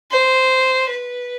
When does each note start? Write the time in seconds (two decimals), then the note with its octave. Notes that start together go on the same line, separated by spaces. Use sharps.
0.11 C5
0.89 B4